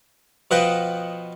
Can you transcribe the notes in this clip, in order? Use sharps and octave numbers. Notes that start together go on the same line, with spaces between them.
B2 F3 B4 D#5 F#5 G5